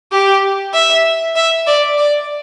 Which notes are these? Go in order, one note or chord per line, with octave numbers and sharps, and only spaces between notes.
G4
E5
E5
D5
D5